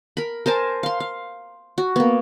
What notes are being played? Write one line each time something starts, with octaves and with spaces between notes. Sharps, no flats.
A#4 B5
A#4 C5 G#5 A5
F5 C6
F5
F#4
A#3 B3